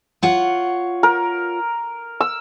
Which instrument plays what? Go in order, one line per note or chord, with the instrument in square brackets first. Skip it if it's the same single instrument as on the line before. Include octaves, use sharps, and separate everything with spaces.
[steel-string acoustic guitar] F4 C#5 F#5
[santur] A#4
E6